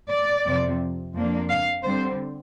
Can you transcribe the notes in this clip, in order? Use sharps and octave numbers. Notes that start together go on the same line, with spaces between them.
D5
F2 C3 F3 C4
F2 F3 A#3 D4
F5
D3 G3 C4 C5